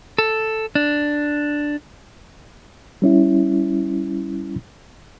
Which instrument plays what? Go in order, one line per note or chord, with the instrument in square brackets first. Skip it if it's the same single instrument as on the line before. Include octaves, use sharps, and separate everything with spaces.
[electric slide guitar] A4
D4
[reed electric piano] G3 C#4 E4